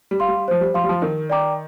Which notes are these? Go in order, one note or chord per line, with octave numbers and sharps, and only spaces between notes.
G3
F5 C6
G3
F3 C5
G3
F3 F5 C6
G3
F3
D#3 A#4
D5 G5 A#5 D6